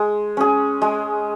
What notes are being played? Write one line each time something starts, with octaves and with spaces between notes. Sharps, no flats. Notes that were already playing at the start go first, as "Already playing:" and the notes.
Already playing: G#3
C#4 G#4
G#3